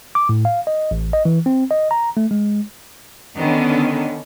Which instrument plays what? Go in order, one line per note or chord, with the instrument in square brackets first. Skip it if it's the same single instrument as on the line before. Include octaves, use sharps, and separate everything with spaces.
[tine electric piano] D6
A2
F5
D#5
A1
D#5
E3
C4
D#5
A#5
A3
G#3
[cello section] D3 D#3 B3 C#4